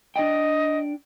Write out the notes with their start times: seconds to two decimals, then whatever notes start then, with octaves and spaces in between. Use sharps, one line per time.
0.16 D4 D#5 G5